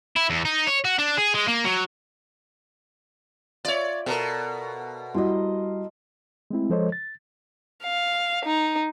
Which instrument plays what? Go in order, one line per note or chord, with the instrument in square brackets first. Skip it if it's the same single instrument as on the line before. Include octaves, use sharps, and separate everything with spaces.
[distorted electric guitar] E4
E2
D#4
C#5
F#4
D4
G#4
G#3
A#3
F#3
[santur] F4 E5 [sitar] C#5 D5
[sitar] B2 [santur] A4 A#4
[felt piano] G3 E4 F#4 [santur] D#5 C6
[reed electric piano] G#3 A3 C4 E4
F3 G#3 A4 C5 C#5 D#5
A6
[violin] F5
D#4